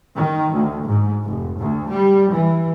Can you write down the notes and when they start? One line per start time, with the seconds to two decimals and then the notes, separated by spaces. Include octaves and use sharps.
0.16 D#3
0.54 D2
0.88 G#2
1.24 F1
1.57 D2
1.89 G3
2.31 E3